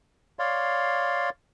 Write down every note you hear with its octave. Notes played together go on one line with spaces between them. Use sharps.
C#5 D5 F5 C6